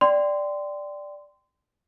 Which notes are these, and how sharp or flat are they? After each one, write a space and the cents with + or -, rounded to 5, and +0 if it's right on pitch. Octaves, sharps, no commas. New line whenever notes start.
D5 +0 G5 +0 C6 -20